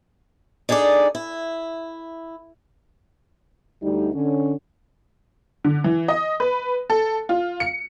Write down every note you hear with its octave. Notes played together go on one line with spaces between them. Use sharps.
D4 D#4 G#4 A4 D5
E4
D2 G3 D#4
D3 C#4
D3
E3
D#5
B4
A4
F4
C#7